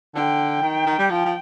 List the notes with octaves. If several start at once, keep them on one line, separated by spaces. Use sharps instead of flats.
D3 G5
D#3
D#3
G3
F3 G5
F3